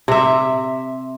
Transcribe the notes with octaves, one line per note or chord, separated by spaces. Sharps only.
C3 E5